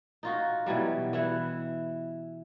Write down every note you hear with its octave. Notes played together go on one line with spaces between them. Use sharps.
D#4 F4 F#4
B2 E3 F#3 G3
E3 E4 F#5